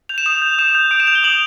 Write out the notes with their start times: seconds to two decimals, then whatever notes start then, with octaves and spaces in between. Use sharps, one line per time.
0.09 G6 F7
0.18 E7
0.26 D#6 F7
0.42 G6
0.59 D#6 E7
0.75 G6
0.91 D#6 D7
1.00 E7
1.07 G6 F7
1.15 G7
1.24 D#6 F#7